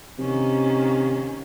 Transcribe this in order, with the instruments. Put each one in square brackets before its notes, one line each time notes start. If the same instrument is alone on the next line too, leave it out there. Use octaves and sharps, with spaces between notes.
[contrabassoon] C3 [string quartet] D#3 A#3 C#4